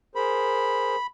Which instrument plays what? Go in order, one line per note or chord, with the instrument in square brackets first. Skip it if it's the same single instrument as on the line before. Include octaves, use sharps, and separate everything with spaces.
[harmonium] G#4 A#4 C5 [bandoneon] B5